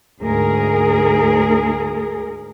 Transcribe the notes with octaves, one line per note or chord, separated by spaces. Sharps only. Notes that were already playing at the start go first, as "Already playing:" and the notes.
D2 G#2 G#4 A#4